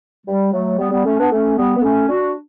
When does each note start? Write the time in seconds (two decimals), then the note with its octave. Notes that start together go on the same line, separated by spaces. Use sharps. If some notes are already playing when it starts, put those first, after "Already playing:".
0.26 G3
0.53 F#3 A3
0.79 G3 B3
0.91 G3 B3
1.05 A3 C#4
1.18 B3 D4
1.31 A3 C#4
1.57 G3 B3
1.77 B3
1.82 A3 C#4
2.09 D4 F#4